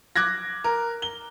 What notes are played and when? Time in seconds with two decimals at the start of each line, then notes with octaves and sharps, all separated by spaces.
0.16 D6 F#6 G#6 A#6
0.64 A#4
1.02 G7